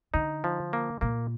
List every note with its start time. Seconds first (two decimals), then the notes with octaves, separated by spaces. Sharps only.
0.14 D3 D#4
0.44 F3
0.73 A#3
1.01 A#2 A#3